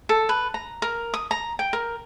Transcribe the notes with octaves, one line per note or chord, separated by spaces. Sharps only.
A4
B4
A#5
A#4
D#6
A#5
G5
A#4